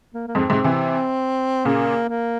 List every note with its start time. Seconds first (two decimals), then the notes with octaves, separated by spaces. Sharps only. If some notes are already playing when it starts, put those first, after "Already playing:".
0.14 A#3
0.28 A#3
0.35 F2 G#2 C4
0.50 G#2 C3
0.64 C3 E3
1.65 A#2 C#3 A#3
2.09 A#3